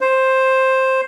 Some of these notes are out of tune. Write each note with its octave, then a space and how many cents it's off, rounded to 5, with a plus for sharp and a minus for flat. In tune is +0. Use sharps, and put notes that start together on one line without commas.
C5 +10